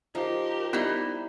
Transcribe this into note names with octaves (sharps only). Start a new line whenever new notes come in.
F3 D#4 G4 A#4
G3 B3 D#4 E4 D#5 E5